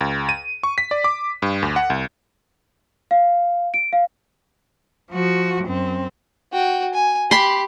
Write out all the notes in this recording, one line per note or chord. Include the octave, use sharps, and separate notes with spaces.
C#2
D#7
C#6
B6
D5
D6
G2
D2
F#5
C2
F5
D7
F5
F3 F#4
F#2 C4
F#4 G5
G#5
G4 B5 C6